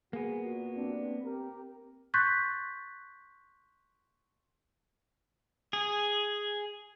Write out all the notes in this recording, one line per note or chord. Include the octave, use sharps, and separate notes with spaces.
A#3 B3 F#4 G#4
A#2 F#4
G2 C4 D4
G4 A#4
C6 C#6 F#6 G6 A6 B6
G#4